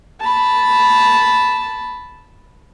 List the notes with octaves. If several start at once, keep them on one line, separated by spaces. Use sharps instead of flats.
A5 B5